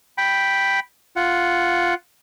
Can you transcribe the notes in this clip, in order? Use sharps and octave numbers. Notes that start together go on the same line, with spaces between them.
G5 B5
F4 F#5